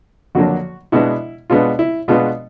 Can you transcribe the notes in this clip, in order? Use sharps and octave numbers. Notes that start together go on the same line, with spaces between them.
F2 D3 F#3 A#3 D4 F#4
B2 G#3 B3 D4 E4
B2 G#3 B3 D4 F4
E4
B2 G#3 B3 D4 F4